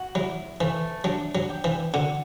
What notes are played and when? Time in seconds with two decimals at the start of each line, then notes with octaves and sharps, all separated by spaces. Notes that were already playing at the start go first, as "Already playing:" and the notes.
Already playing: F#4
0.15 F#3 E4
0.61 E3 A3
1.04 F#3 D4
1.35 F#3
1.50 G4
1.64 E3
1.94 D3 F#4